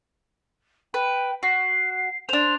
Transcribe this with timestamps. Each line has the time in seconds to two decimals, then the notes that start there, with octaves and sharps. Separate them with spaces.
0.94 B4 G5
1.43 F#4 C7
2.29 D4 C5 F7